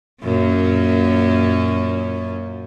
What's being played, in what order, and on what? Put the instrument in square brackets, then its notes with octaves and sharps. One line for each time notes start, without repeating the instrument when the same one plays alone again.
[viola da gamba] F#2 A#2 C#4